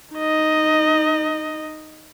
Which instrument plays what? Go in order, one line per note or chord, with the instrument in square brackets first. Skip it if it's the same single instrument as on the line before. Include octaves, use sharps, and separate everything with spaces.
[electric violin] D#4 D#5